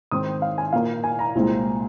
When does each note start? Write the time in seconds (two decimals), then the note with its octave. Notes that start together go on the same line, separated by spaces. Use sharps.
0.11 G#2 D#3 C4 D#6
0.42 F5
0.58 G#5
0.73 A#2 A#3 F5
1.04 G#5
1.19 A#5
1.35 C2 A#2 G#3 C4